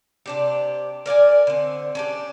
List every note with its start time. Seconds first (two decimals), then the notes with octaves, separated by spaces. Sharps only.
0.26 C3 D4 G4
1.06 A#4 D5 F5 G#5
1.47 D3 C4
1.95 C#4 D4 G4